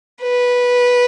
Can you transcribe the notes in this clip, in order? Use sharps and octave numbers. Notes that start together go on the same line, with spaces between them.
B4